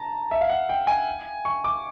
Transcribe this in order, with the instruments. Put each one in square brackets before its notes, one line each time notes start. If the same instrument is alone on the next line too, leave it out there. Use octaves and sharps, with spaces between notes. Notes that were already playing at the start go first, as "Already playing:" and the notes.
Already playing: [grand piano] A5 A#5
E5
F5
F#5
G5
G#5
C#6
D6